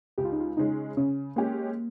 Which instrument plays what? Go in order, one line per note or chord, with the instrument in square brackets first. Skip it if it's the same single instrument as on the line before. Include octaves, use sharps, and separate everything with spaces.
[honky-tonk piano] C#2 [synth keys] G4
[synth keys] F4
D#4
F4
[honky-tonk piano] C#3 G#3 C#4 [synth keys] D#4
[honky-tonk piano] C#3 [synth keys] C#4
[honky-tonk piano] G#3 C#4 G4 C#5 [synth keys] A#3